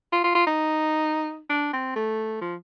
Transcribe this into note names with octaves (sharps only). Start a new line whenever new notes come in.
F4
F4
F4
D#4
D4
C4
A3
F3